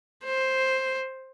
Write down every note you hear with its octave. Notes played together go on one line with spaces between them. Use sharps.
C5